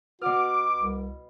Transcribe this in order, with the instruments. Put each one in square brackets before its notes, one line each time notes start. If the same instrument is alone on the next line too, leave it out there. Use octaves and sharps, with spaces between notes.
[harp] B2 F6 [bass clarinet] F#4 [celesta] B4 [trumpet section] D6
[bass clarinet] C2